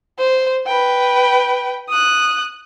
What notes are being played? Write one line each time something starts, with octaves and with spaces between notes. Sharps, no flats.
C5
B4 G5
D#6 F#6